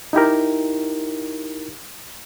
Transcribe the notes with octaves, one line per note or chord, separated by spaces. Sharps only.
D#4 E4 G4 A#4